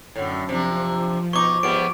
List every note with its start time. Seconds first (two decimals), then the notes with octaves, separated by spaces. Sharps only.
0.16 F#2 A2 D3
0.49 C3 F3 D4
1.33 B2 D#4 C#6 D6
1.63 G#2 G3 B3 D7